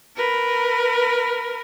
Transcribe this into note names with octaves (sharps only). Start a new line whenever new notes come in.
A#4 B4